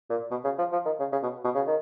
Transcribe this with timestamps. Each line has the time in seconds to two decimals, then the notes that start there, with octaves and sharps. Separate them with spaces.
0.10 A#2
0.31 B2
0.44 C#3
0.58 F3
0.72 F3
0.85 D#3
0.99 C#3
1.12 C#3
1.23 B2
1.44 B2
1.55 C#3
1.67 D#3